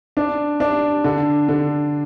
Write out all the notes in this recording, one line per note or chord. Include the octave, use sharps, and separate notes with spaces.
D4
D4
D3
D3